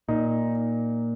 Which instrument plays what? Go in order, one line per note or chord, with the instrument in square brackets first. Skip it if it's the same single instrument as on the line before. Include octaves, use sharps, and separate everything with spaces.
[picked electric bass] A#2 [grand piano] D#4